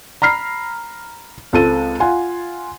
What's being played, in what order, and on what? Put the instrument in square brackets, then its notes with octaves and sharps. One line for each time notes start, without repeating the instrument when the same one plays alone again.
[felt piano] A#5 B5 F6 C7
C#2 C4 A4 D#7
F4 F#5 G#5